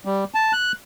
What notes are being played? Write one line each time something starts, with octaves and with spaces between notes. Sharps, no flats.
G3
A5
F#6